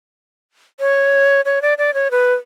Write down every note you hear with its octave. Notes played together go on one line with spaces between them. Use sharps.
C#5
C#5
D5
D5
C#5
B4